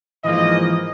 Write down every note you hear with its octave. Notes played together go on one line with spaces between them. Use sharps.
G#2 E3 F3 A#3 D#5